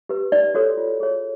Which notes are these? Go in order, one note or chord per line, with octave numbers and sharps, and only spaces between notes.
G4 B4
D#4 D5
F#4 A4 C#5
F4
G#4 C#5